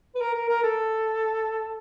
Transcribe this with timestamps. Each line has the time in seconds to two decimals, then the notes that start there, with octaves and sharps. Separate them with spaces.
0.15 B4
0.21 A#4
0.34 A#4
0.49 A#4
0.63 A4